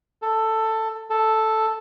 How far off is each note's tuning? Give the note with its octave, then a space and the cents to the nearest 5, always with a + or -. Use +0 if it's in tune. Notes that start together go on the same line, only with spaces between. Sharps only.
A4 +10
A4 +0